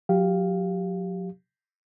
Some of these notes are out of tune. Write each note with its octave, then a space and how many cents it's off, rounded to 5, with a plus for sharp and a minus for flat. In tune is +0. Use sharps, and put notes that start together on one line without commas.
F#3 -40 G4 +0 F5 +0